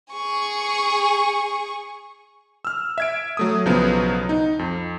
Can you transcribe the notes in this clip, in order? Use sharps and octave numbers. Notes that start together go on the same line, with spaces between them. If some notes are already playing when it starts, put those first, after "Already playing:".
G#4 C#6
E6 F6
E5 G#6 D7
F#3 A3 D#6
B1 C#3 F3 F#3 B3
D#4
F2